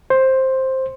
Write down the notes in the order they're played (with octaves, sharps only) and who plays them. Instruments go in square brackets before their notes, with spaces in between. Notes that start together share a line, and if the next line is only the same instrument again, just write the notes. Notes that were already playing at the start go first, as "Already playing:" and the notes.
[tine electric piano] C5